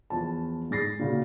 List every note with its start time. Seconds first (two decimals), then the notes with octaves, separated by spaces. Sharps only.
0.10 E2 F3 A5
0.71 G#2 G#4 A6 A#6 C7
0.99 A#2 C#3 F#4